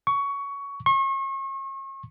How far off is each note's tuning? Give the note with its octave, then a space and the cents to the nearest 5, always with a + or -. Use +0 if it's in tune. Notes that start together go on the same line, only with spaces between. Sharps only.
C#6 +15
C#6 -40